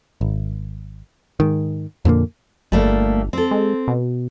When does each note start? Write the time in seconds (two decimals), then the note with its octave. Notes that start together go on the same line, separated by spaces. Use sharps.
0.21 G#1
1.40 G#2 D#3
2.05 F2 A#2 D3 A#3
2.72 G1 G3 A3 A#3
3.33 C4 A4
3.51 G#3
3.88 B2